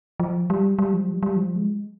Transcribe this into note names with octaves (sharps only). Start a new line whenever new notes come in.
F3
G3
G3
F3
G3
G3
F3
G#3